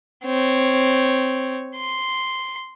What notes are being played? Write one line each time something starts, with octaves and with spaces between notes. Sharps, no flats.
C4 C#5
C6